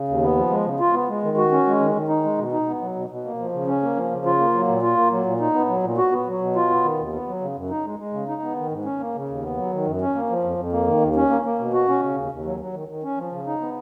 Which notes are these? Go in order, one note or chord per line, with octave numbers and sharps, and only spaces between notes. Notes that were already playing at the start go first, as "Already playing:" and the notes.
Already playing: C#3
D#2
B3
F3
G#3
C#3
F4
B3
G#3
D#3
F#4
C#4
G#3
D#3
D#3
D#4
G#3
B2
D#4
B3
F#3
B2
B2
A#3
F3
C#3
C#4
A#3
F3
C#3
F4
A#3
F#3
A#2
F4
A#3
F#3
A#2
D#4
B3
F#3
A#2
F#4
B3
F#3
B2
F4
B3
D#3
D#2
B3
F#3
C#3
F#2
D#4
G#3
G#3
C#3
D#4
B3
D#3
G#2
C#4
A#3
C#3
D#2
B3
F#3
D#3
F#2
C#4
A#3
F3
F2
F2
A#3
D#3
D#2
C#4
A#3
A#3
B2
F#4
C#4
C#3
D#2
D#2
F#3
F#3
D#3
D#3
C#4
F3
C#3
D#4
B3